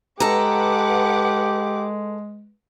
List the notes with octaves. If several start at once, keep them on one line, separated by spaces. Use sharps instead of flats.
G#3 G4 A4 B4 F#5 A#5 D6